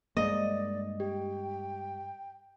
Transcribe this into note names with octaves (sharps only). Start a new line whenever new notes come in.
G2 G#3 A#3 D5 D#5
G4 G5